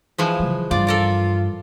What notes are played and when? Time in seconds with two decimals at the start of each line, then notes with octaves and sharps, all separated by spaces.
0.18 E3 F3 G#3
0.39 C#3 F#3
0.71 G2 F4 D5
0.87 A4 A#4 D5